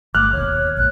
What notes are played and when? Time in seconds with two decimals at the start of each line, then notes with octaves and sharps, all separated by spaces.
0.15 G1 A3 D6 F6 F#6
0.33 D#1 D#2 B2 C#5
0.77 A#1 A2 F#6